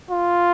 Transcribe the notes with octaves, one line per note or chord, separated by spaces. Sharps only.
F4